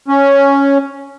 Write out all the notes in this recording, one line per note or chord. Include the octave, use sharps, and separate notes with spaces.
C#4